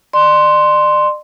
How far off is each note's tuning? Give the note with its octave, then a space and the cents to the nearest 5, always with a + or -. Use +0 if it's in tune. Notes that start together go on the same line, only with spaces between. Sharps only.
D5 +40 C6 +0